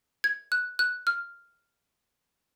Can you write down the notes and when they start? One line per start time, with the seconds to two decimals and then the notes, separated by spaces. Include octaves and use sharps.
0.24 G#6
0.52 F#6
0.79 F#6
1.07 F6